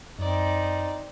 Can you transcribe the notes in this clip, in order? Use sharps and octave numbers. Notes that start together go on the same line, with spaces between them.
F#2 C4 D#4 D5